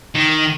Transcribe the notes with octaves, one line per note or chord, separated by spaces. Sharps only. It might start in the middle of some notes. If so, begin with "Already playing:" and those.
D#3